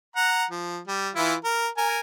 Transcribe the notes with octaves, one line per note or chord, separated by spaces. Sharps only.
F#5 A#5
F3
G3
E3 E4 F4
A#4
A#4 G#5